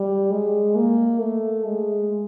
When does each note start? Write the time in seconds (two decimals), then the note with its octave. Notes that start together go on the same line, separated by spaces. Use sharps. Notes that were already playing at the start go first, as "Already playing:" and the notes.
Already playing: G3
0.31 G#3
0.76 A#3
1.20 A3
1.64 G#3